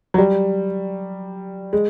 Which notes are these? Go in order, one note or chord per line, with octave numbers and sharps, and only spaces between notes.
F#3
G3
G#3